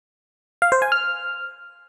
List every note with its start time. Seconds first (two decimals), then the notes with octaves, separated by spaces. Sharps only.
0.62 F5
0.72 C5
0.82 G#5
0.92 F6